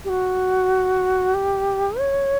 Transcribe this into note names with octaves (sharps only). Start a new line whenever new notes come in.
G4
F#4
G4
C#5